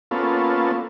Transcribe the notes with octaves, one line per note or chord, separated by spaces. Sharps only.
A#3 B3 C#4 F4 A4